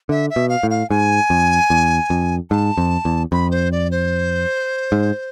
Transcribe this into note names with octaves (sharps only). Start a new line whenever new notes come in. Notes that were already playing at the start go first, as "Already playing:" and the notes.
D3 E5
E5
B2
F5
A2
F5
G#2 G#5
F2
E2
F2
G#2 A5
F2
E2
F2 B5
C5
D5
C5
G#2